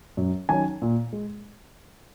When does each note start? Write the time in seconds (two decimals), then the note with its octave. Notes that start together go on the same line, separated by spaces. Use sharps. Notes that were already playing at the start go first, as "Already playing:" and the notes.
0.17 F#2
0.49 D#3 F#3 C#4 G#5
0.82 A#2
1.13 G#3